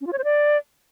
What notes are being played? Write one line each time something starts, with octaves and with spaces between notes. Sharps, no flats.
C#4
F4
C#5
C5
D5